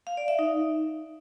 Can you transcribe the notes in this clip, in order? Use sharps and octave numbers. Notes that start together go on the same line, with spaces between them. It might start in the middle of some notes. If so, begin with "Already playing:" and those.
F5
D5
E5
D#4